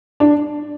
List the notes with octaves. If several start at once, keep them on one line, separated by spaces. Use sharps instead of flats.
D4